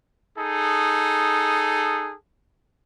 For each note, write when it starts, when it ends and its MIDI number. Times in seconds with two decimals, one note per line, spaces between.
0.37 2.14 63
0.37 2.14 68
0.37 2.14 69